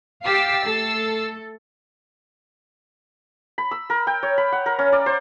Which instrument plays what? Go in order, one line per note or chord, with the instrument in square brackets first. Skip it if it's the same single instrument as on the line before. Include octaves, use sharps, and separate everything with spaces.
[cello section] G4 F5 [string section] E6 A6 C7
[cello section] A3 A4
[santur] B5
E6
A#4
G5
C#5
B5
F#5
A#4
C#4
D5
C5